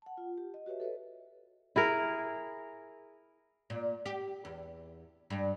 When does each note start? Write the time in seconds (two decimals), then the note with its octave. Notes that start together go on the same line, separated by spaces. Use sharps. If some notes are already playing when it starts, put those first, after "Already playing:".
0.02 F#5 A5
0.17 F4
0.38 G4
0.54 D#5
0.66 F#4 G4 B4 C#5 E5
0.80 A4 B4 C#5 D#5
1.76 E4 G#4 A#4
3.70 A#2
4.06 G4
4.45 E2
5.30 G2